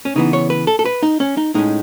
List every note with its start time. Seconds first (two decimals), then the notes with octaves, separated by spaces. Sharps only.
0.05 C#4
0.16 C#3 E3 B3 D#4
0.33 C#5
0.50 B4
0.67 A4
0.79 A4
0.85 B4
1.03 D#4
1.20 C#4
1.37 D#4
1.54 A2 G#3 C#4 D#4